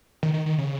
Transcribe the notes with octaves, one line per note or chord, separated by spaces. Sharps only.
D#3
D#3
D#3
C#3